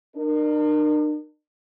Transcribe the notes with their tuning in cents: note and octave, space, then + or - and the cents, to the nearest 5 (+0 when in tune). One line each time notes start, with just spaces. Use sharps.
D4 +45 A#4 +0